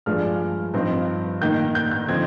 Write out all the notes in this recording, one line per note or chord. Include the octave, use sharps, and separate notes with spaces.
G2 F3 G#3 D4 F6
G2 F3 C4 D#4
D#3 A#3 D#4 G6
G6
G6
D3 F3 C4 D#4 G#6